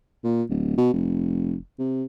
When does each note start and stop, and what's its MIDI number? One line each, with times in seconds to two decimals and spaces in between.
0.24 0.42 46
0.49 0.75 26
0.78 0.90 47
0.93 1.55 29
1.79 2.04 48